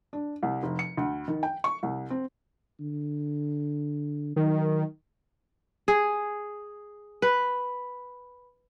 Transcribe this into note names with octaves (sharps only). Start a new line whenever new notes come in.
D4
C2
F1
C#7
D2
D#3
G5
C#6
C2
C4
D3
D#3 F#3
G#4
B4